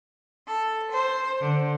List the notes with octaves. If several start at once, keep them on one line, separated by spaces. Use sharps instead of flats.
A4
C5
D3